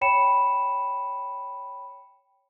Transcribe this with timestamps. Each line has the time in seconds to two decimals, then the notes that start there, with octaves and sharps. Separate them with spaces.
0.01 C#5 G5 B5 C#7 E7